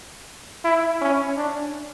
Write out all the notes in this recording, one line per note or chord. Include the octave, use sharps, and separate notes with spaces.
E4
C#4
D4